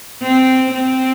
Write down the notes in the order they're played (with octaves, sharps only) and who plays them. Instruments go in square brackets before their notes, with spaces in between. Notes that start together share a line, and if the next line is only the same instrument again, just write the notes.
[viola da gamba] C4
C4